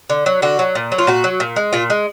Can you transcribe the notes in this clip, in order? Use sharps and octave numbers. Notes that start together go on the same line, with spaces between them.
D3
F#3
D3 F#4
F#3
A#2
F#3
F4
A#2 F#4
F#3
A#2
G#3
A#2 F4
G#3